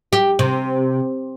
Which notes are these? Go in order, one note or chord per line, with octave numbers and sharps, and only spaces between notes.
G4
C3